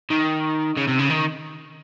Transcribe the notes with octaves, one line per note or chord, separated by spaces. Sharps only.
D#3
C#3
C3
C#3
D#3